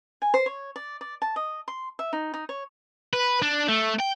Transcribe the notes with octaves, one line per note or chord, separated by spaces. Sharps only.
G#5
C5
C#5
D5
D5
A5
D#5
C6
E5
D#4
D#4
C#5
B4
D4
A3
G5